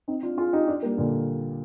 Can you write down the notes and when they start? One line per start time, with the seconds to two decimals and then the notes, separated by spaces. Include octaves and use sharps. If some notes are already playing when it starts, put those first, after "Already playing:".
0.08 C4 D#4
0.23 D4 F4
0.38 F4 G#4
0.53 D#4 G4
0.68 D4 F4
0.83 G3 A#3
0.98 A#2 D3